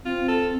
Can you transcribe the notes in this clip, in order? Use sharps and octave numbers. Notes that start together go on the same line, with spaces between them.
C4 F4
A4